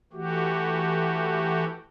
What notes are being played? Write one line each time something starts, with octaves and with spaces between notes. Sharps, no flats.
E3 A3 F#4 G4